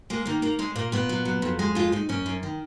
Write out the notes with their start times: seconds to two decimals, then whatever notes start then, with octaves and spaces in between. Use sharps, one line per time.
0.10 G#3 A#3
0.26 D#3 A#3
0.42 D#3 A#3
0.59 F2 G#3
0.76 A#2 A#3
0.92 A#2 B3
1.09 F#3
1.25 F#3
1.42 F2
1.59 G#3
1.75 F2 F4
1.92 F2 D#4
2.09 F#2 C#4
2.26 F#2
2.43 D#3